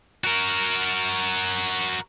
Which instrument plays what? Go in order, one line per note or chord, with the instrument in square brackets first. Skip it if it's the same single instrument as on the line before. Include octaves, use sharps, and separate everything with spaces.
[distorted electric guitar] F#4 A#4